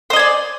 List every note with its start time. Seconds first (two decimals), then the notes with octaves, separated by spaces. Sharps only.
0.10 C5
0.13 D#5
0.16 G#5
0.19 D5